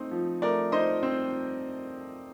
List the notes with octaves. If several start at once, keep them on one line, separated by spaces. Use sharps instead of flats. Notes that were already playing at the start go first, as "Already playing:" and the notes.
Already playing: A3 C4 D#4
F3
A3 A#4 D5
D#4 C5 D#5
C4